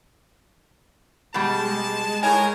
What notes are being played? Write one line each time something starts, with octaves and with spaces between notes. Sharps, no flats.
B2 G3 G#3 A5
A2 A#4 C#5 G#5